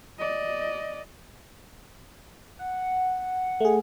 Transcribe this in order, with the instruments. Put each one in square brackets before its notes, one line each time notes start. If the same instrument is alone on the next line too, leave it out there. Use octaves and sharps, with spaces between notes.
[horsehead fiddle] D5 D#5
[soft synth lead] F#5
[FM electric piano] A3 G#4